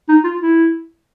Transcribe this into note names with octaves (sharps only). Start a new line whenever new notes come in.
D#4
F4
E4